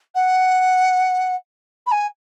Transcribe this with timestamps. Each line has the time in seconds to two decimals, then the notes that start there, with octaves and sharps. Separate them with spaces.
0.15 F#5
1.87 B5
1.92 G#5